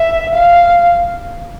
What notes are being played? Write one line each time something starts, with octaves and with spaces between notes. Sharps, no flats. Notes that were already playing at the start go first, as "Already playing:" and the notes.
Already playing: E5
F5